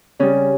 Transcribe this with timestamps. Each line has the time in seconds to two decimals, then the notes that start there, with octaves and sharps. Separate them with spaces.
0.19 C#3 G3 C#4